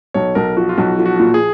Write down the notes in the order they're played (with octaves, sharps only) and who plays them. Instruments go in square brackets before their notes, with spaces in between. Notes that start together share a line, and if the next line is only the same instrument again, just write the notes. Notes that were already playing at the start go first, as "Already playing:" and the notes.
[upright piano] B1 [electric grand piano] C#5
[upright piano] B1 [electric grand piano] A#4
[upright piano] F3 [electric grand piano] F#4
[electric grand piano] F4
[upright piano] B1 [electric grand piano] F#4
[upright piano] F3
[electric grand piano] F#4
[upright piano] A#2
[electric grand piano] G#4